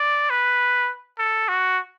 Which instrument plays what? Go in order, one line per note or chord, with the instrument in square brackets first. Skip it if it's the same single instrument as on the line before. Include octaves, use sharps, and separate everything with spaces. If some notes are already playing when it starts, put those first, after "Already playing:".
Already playing: [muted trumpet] D5
B4
A4
F#4